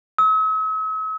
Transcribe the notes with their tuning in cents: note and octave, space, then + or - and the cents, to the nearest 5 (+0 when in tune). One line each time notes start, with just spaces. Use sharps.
E6 -45